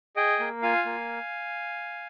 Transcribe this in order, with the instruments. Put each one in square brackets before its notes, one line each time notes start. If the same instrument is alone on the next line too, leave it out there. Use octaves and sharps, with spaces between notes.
[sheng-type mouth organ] G#4 D#5 G5
A#3
F4 F5 G#5
A#3